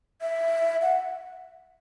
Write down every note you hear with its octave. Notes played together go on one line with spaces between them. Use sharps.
E5
F#5